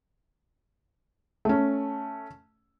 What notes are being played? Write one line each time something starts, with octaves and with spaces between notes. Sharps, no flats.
A3 C#4